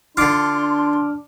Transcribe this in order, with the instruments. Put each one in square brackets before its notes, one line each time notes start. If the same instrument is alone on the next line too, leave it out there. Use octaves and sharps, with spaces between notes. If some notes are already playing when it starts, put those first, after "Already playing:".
[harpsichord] D3 F4 [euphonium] D4 [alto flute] C6 [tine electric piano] D6 F6